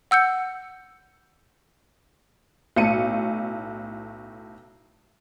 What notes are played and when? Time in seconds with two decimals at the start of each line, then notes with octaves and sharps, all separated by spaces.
0.11 F#5 E6 G6 C#7
2.76 B1 A2 C#7 D#7